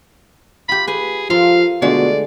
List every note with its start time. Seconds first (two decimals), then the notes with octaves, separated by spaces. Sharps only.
0.69 F4 G4 B5
0.87 G#4 B4 B5
1.30 F3 F4 A4 A#4 F5
1.82 B2 D3 G#3 A3 D5